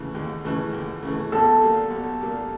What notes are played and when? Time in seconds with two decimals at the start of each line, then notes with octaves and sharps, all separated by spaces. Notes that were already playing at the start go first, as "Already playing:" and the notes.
Already playing: D#2 C#3 E3 A3
0.15 D#2
0.44 C#3 E3 A3
0.73 D#2
1.02 C#3 E3 A3
1.32 B1 A4
1.62 A#2 G3 A#3
1.91 B1
2.21 A#2 G3 A#3